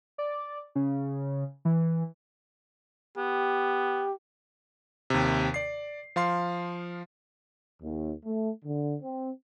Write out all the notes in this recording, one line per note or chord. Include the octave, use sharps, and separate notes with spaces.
D5
C#3
E3
B3 G4
D#2 C3
D5 C7
F3 F5 C6 C7
D#2
A3
D3
C4